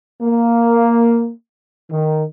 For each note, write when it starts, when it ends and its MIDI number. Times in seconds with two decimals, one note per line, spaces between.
0.22 1.32 58
1.92 2.24 51